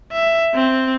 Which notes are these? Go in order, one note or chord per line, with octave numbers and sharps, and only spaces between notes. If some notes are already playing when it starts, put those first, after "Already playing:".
E5
C4